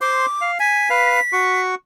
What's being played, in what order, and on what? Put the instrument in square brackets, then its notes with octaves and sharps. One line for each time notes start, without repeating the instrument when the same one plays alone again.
[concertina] C5 C6 [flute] D6
[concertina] F5
[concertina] G#5 [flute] B6
[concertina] B4 F5
F#4 C#6